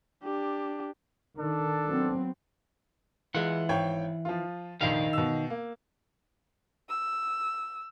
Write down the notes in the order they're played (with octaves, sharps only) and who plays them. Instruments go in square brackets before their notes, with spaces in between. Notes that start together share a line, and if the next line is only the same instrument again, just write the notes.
[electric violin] D4 G4
[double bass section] D#3 [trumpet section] D4 A4
[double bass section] F#3 B3 C4
[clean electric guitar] E3 F#5 [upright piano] G#3 F4
[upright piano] G#1 C#5 G5
F3 F4
[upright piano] F1 A#1 [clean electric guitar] D#3 F5
[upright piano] B2 E6
A#3
[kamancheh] E6